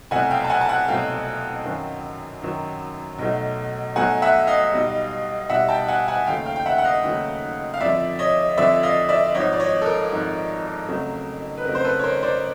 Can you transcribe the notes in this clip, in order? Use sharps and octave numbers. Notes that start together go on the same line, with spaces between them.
C2 B2 F#3 A3 F#5 G#5
F5 G5
A5
F#5 G#5
A5
F#5 G#5
C2 B2 F#3 A3 F5 G5
F#2 D#3 F#3
F#2 D#3 F#3
B1 B2 F#3 A3
B1 B2 F#3 A3 F#5 G#5
E5 F#5
D#5 F5
B1 B2 G3
B1 B2 G3 E5 F#5
G5 A5
F#5 G#5
F#5 G#5
D#2 C#3 F#3 A3 F5 G5
F5 G5
G5
E5 F#5
F#5
D#5 F5
D#2 C#3 F#3 A3
F5
F2 D3 F3 D5 E5
C#5 D#5
F2 D3 F3 D5 E5
D#5 F5
D5 E5
G#1 G#2 F3 C#5 D#5
D5
C#5 D#5
A4
A#4
G#1 G#2 F3
F2 C#3 F#3 A3
B4
F2 C#3 F#3 A3 A#4
C5
A4 B4
C#5
A#4 C5
C5 D5